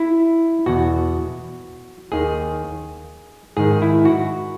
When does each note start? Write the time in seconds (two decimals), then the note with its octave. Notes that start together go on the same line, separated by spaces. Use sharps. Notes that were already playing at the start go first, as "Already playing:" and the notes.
Already playing: E4
0.66 E2 B2 F#4
2.12 D#2 D#3 G#4
3.57 G#2 D#3 G#4
3.82 E4
4.05 F#4